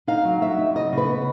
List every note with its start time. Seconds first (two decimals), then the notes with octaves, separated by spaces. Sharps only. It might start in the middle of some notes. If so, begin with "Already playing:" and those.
0.07 D#4 F5
0.25 F#3
0.42 F#3 E5
0.58 D#4
0.75 C#3 D#5
0.92 C#3
0.97 B4
1.09 B3